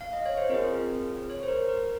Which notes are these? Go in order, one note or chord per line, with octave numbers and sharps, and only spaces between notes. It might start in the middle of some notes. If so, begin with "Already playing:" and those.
F5
D#5
C#5
C5
C4 F4 G#4 A#4
C#5
C5
A#4
A#4